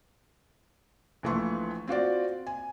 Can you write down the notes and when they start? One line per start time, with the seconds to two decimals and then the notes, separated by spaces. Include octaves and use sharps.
1.23 A#1 E3 A3 F4 C6 C#6
1.88 C4 F4 F#4 D5
2.47 G#5